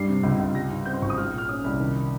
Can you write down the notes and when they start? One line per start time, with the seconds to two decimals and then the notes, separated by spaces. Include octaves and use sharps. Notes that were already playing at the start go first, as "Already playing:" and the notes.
Already playing: G2 G3 C7
0.08 C3
0.23 C#2
0.39 C#2
0.55 G3 A#6
0.70 G#2
0.86 C4 G6
0.94 C6
1.02 G#1 C#6
1.10 D#6
1.18 G#3 F6
1.33 A#2 F6
1.49 C#4 D#6
1.64 C2
1.80 D#3